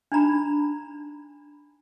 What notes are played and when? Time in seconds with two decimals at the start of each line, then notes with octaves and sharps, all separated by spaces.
0.12 D4 D#4 A#5 B5